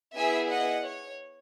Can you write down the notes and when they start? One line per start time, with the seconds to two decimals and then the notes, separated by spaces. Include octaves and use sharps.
0.15 B3 E4 G#4 E5 G#5
0.50 D#5 F#5
0.86 C#5